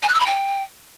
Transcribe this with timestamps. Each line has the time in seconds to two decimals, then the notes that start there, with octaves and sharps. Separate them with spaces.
0.02 G#5
0.08 F#6
0.14 E6
0.20 B5
0.26 G5